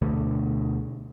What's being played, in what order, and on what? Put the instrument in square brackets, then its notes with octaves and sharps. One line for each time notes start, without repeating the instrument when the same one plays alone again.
[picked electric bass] D2 B2 D3 A3